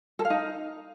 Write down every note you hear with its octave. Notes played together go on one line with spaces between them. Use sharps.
A4
F5
D#4